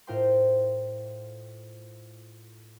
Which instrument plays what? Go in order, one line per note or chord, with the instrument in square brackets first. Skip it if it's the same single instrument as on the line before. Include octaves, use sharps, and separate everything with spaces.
[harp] A2 F4 A#4 C5 G5 C6